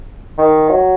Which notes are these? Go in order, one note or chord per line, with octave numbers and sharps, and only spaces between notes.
D#3
F#3